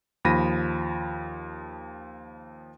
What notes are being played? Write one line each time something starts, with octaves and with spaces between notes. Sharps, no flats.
D#2 F3 B5 A#6 D#7